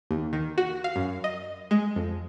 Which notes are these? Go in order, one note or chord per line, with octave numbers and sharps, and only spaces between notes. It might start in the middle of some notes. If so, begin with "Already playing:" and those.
D#2
D#3
F#4
F5
F#2
D#5
G#3
F2